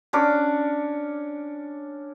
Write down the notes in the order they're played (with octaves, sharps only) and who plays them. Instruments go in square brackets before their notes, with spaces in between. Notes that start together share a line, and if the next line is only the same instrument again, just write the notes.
[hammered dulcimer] C#4 D4 D6